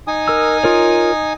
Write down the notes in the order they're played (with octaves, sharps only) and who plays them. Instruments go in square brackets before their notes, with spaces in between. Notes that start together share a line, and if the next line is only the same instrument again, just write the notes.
[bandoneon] D#4 G#5 D#6
[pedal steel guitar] A#4 E6
F4 A#4 C#5